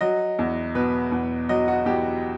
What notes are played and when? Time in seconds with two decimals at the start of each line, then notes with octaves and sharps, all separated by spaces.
0.01 F#3 D#5
0.39 E2
0.75 B2 B4
1.12 E2
1.49 F#3 D#5
1.68 F#4
1.86 E2 G4